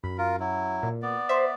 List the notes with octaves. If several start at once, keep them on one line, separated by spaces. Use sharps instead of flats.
F#2 B5
F4 A#4
F#3 E4
A#2
B3 D5
C5 E5